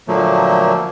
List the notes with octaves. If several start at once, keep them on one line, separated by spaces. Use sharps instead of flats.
A#2 D3 F3 F#3 A3 A#3